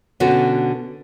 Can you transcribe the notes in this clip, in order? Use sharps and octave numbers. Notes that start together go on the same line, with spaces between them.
B2 D3 B3 C#4 F#4